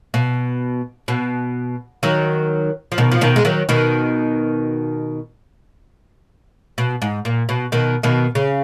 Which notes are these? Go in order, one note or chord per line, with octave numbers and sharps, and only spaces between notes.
B2
B2
D#3 F#3
F3
B2 D#3
F3
B2 D#3
G#3
D#3 F#3
B2 D#3
B2
G#2
A#2
B2
B2 D#3
B2 D#3
C#3